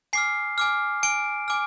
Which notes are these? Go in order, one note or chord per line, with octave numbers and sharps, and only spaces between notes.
G#5 D6 F6 C7
G#5 D6 F6
G#5 D6 F6 D7
G#5 D6 F6